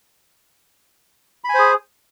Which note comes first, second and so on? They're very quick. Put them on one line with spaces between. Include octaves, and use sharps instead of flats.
B5 G#5 C5 G#4